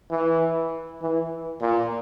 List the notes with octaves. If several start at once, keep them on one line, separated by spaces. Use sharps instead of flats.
E3
E3
A#2